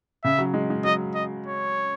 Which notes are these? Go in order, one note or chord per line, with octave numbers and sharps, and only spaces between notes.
C#3 E5
F#3
G#3
G#3
F#3 D#5
D#5
C#5